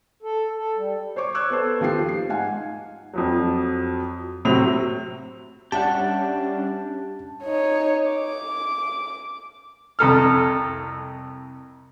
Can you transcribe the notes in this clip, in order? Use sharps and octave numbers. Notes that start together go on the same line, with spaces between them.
A4
A4
G3
C5 C#5 C#6 D6
C#6 D6 E6 F#6 G#6
B3 A4 C5
D#2 F3 G4 C7
C7
G#2 F5 F#5 G#5
F2 F3 F#3
A2 C3 F#3 C4 F7
G3 C#4 D4 G4 E5 F#5 A5
D#4 C#5
D6
C2 F2 A4 F6